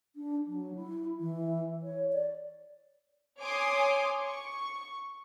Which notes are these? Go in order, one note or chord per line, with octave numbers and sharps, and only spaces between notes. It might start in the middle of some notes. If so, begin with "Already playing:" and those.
D4
F#3
E4
E3
C#5
D5
C#5 G#5 C6 D6 D#6
C#6